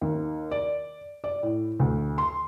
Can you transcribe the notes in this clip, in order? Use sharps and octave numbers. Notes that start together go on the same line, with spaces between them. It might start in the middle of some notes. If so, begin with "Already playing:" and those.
D#2
D5
D5
A2
D2
C6